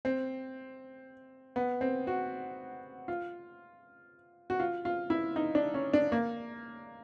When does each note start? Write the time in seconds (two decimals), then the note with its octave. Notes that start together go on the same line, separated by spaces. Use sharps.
0.05 C4
1.56 B3
1.81 C4
2.07 F#4
3.08 F4
4.50 F#4
4.60 F4
4.85 F4
5.10 E4
5.36 D#4
5.55 D4
5.74 C#4
5.93 D4
6.12 A#3